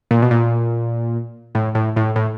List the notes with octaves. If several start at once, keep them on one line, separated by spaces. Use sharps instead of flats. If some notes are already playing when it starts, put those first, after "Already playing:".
A#2
B2
A#2
A2
A2
A2
A2